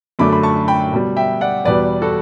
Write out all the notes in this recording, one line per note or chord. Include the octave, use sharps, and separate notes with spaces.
F#2 D3 A3 B5 D6
B5
A5 C#6
G5 B5
B2 G3
E5 G5
D5 F#5
E2 B2 G3 B4 D5
F#4 A4